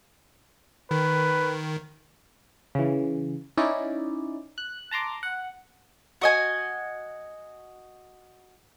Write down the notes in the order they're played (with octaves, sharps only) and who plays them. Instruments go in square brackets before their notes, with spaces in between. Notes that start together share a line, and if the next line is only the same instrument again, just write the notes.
[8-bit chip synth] D#3 [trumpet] B4
[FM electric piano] C#3 E3
C#4 D#4 E4 D5
F#6
A5 A#5 C6 D6
F#5
[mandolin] F#4 D#5 G#5